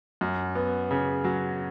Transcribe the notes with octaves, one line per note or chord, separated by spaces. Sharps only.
F#2
B3
C#3
F#3